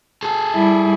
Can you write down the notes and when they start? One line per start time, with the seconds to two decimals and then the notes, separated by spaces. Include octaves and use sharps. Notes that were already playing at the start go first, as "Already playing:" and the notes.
0.23 G#4 A4
0.54 G3 E4